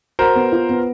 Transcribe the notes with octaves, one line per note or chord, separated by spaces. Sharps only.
F#4 A#4 C5
B3
F4
B3